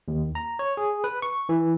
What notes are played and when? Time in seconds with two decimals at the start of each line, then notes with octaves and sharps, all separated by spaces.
0.08 D#2
0.35 A#5
0.59 C#5
0.77 G#4
1.04 B4
1.22 C#6
1.49 E3